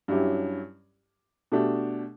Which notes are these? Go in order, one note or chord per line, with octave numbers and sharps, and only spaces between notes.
G2 F#3 C#4 E4 G4
B2 A3 D4 G4